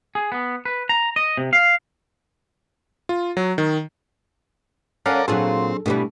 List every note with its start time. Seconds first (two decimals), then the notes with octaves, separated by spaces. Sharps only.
0.15 G#4
0.32 B3
0.65 B4
0.89 A#5
1.16 D#5
1.37 C3
1.53 F5
3.09 F4
3.37 F#3
3.58 D#3
5.06 C#4 A4 A#4 D5 F5 F#5
5.28 A#2 F#3 C4 D4 F4 F#4 G#4 A4
5.86 B2 E3 G3 A3 D4 G4